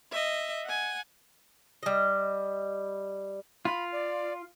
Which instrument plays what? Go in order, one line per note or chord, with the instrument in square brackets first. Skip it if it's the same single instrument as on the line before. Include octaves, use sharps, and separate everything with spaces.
[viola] D#5 E5
F#5 G#5
[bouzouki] G3 D#5
[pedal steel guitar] F4 [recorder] B5
[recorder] D5